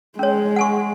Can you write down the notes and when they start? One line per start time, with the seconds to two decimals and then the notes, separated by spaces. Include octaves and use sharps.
0.19 G#3 C#4 C#5
0.56 F#5 G#5 C#6